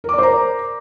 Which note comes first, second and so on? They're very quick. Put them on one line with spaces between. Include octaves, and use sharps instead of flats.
A#4 D6 D5 C5 A#5